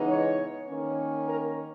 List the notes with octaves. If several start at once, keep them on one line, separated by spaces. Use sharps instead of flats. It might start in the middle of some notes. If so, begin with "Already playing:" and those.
Already playing: C#3 E3 G#3 B3 D#4
C#5
D#3 A#3 C#4
A#4